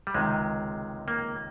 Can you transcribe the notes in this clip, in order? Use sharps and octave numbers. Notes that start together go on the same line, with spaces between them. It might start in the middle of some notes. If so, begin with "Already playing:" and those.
G3
C#2 C3 D#3 G#3
A#3